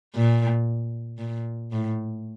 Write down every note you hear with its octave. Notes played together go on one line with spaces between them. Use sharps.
A#2
A#2
A2